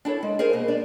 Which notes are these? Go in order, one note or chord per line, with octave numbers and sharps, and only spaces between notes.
D4 E4 A4 C#5
G#3
G#4 A#4 C5 F5
G#2 B2 A#3 D#5
D4 D5